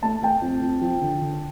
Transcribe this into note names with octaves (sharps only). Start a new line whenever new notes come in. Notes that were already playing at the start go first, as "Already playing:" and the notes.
A3 A5
A3 G5 A5
F2
F2
F3
D3
D3